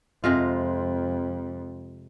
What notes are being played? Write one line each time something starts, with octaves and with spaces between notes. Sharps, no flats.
F2 C3 G#3 F4